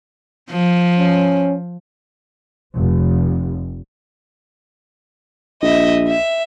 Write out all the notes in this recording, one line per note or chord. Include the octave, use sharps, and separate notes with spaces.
F3
C#4
F1
A#1 D#5 E5
E5